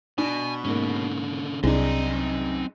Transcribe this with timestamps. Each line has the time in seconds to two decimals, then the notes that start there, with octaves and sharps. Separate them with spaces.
0.18 B2 D4 G#5
0.64 G#2 D3 A#3 C#4
1.63 C2 F#2 C4 D4 D#4 G#4